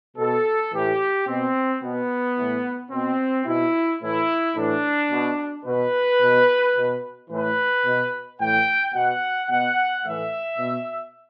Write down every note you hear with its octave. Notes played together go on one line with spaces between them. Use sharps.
B2 A4
A2 E3 G4
B2 C4
B2 B3
A2 E3
B2 C4
B2 E4
A2 E3 E4
A2 E3 D4
B2
B2 B4
B2
B2
A2 E3 B4
B2
A2 E3 G5
B2 F#5
B2 F#5
A2 E3 E5
B2